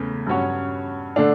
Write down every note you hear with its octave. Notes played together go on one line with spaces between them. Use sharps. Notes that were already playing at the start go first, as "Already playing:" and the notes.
Already playing: E2 C#3 A3 C#4
G2 F#3 C#4 F#4 C#5
D3 A3 D4